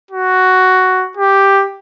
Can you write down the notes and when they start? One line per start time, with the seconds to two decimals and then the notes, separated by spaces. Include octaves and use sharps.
0.11 F#4
1.17 G4